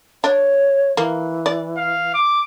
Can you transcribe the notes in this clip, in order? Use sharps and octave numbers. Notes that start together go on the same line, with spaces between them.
D4 C#5
E3 A#3
D5
F5
D6